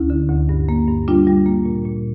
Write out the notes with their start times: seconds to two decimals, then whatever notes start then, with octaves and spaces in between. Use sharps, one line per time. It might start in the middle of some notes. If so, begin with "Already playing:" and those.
Already playing: D2 C#4 E4
0.10 D3
0.29 D2
0.49 G2
0.69 A#3
0.88 G2
1.08 G3 D4 F4
1.27 G3
1.46 A#3
1.65 A#2
1.85 A#2